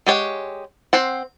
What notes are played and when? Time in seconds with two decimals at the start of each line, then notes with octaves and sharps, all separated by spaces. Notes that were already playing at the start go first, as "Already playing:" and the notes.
0.06 G#3 G4 C#5 F#5
0.93 C4 C5 F#5